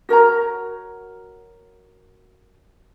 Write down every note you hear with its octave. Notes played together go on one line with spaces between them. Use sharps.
F#4 A#4 C#5 A#5